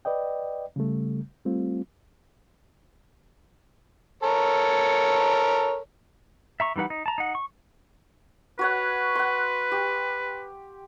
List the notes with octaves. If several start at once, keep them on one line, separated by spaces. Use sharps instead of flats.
B4 D5 D#5 G5
C#3 G3 A3
G3 A3 C4 F4
A4 A#4 C#5
E5 A#5 C#6
E3 G3 D#4 B4 F#5
D#4
A5 A#5
D#4 F#5
C#6
F#4 B4 C#5 F#5
F#5 C6
G4